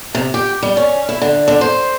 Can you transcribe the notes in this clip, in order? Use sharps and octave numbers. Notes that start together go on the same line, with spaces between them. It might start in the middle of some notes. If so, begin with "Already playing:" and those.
C3
G4
G3
C#4
E4
D3
D3
C5